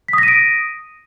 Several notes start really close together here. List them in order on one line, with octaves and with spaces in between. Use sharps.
B6 D#6 A#6 D#7 D7